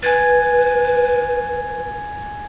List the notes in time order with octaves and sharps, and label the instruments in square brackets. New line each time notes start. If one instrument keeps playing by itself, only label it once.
[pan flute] B4 [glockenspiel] G#5 G#6 A6